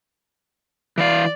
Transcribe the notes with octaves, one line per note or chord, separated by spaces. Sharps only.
E3 D5 F5